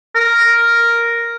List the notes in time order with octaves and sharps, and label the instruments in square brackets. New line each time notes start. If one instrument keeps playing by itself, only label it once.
[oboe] A#4